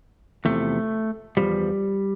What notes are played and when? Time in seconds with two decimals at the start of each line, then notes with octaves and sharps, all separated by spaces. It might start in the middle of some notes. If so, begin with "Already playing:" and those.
0.45 E2 C3 F3 A3
1.37 E2 C3 F3 G3